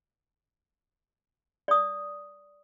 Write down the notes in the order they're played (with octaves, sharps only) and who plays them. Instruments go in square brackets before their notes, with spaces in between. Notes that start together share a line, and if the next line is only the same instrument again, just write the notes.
[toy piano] D5 D#6